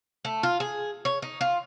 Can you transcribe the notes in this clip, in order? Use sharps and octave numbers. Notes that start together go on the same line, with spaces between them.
A3
F4
G#4
C#5
D#4
F4